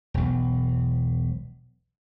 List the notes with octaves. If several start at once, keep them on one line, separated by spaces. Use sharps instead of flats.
E1 B1